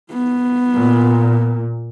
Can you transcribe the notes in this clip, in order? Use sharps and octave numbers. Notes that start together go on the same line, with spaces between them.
B3
A#2